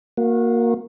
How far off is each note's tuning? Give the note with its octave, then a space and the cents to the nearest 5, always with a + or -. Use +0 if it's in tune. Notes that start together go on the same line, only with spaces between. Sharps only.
A#3 +0 F#4 -25